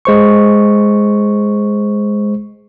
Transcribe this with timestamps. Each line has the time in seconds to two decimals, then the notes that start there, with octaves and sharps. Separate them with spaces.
0.05 G#3 C5 C#6